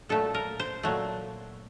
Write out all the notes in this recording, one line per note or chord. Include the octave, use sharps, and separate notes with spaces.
A#2 F#3 A3 A4
A#4
C5
A#2 F#3 A3